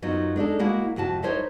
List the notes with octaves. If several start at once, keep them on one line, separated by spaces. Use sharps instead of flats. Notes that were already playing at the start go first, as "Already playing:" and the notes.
F#2 F#3 B3 D#4 F4
G#3 D4 D#4 A4
G#3 A#3 E4 F#4 A#4 F#5
F2 C3 F#4 A5
D#4 E4 A#4 C5 C#5 D#5